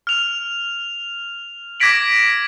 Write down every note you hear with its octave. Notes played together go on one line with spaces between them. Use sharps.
F6 F7
D6 G#6 A#6 B6 D7 F#7